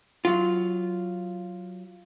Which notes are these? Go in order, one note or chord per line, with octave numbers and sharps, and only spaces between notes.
F#3 F4